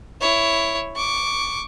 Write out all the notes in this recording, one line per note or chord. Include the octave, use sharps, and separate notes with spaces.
E4 C#5
C#6 D6